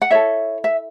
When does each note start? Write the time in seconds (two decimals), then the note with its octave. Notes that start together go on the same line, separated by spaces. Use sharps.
0.02 F#5
0.11 E4 A4 C#5 E5
0.64 E5